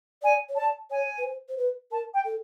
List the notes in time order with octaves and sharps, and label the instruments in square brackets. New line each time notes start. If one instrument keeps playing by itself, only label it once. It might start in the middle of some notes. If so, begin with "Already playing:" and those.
[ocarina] D5 [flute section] G#5
[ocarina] C#5
[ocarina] D5 [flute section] A5
[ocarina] C#5 [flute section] G#5
[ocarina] B4
C5
C5
B4
[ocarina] A#4 [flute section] A5
[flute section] G5
[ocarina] A4